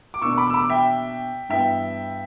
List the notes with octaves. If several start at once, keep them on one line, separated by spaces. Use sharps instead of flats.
D6
B2 A#3 D4 C#6 E6
B5 D6
E6
B5 D6
E5 G5
G2 E3 B3 E5 G5